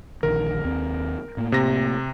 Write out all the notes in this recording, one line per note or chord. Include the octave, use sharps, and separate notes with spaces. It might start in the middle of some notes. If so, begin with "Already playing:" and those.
A#1 D3 D#3 A#4
D#2 C4
A2 A#3
C3 A#6